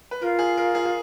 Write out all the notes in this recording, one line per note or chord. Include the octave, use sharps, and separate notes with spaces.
B4
F4 A#4
G#4
A#4
G#4
G#4